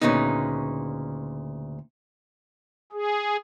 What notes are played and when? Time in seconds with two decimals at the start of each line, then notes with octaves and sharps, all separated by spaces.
0.02 D2 A#2 C#3 B3 D#4
2.92 G#4